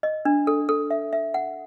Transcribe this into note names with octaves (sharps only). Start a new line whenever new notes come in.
D#5
D4
A4
A4
E5
E5
F#5